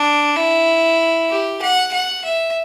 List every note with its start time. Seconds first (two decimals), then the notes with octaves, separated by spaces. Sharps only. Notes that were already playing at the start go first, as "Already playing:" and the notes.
Already playing: D4
0.36 E4
1.30 G4
1.62 F#5
1.93 F#5
2.25 E5